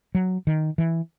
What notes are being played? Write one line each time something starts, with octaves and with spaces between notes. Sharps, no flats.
F#3
D#3
E3